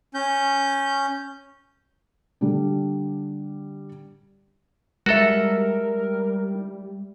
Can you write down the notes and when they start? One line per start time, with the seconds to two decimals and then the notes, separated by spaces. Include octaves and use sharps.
0.14 C#4 G6
2.41 D3 G3 D4
5.06 G3 G#3 F#4 A4 A#4 E5